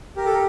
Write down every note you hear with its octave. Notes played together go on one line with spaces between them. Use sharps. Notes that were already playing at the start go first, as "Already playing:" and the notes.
G4 A#4
A4
A#4